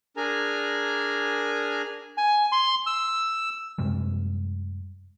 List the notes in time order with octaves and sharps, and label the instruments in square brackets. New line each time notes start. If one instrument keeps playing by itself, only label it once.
[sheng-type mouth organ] D4 G#4 A#4 G#5 A#5
[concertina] G#5
C6
E6
[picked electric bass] F#2 C3 G3 G#3